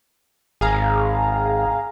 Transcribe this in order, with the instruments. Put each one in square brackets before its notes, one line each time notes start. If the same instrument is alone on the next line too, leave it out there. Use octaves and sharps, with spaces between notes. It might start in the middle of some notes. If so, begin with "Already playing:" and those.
[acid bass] G#1 [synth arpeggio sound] G#4 F5 A#5